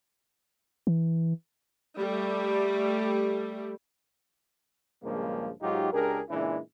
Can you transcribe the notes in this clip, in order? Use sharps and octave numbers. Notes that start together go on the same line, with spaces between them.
E3
G3 A3
A#1 G2 C#3 F3 G#3 A#3
G#2 F#3 D#4 F4 G4
C#2 D4 G4 G#4 A#4
A#2 C#3 E3 G#3 D4 E4